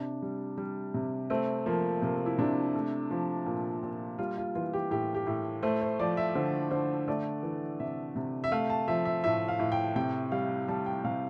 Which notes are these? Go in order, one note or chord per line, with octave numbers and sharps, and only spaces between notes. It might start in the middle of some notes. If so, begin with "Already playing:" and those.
Already playing: C3 D4
G3
G3
C3
A3 C4
F3 A#3
C3 A#3
E4
C3 D4
A3
F3
A#2
A#2
G3 F4
F4
E3 F4
G4
A2 G4
G4
A2
A3 C5
C5
F3 D5
E5
D3 C5
D3 C5
A3 D5
E3
C3 E5
C3
E5
A3 F5
A5
F3 E5
E5
A2 E5
F5
A2
G5
C3 G5
G3 F5
G3 A5
G5
C3 F5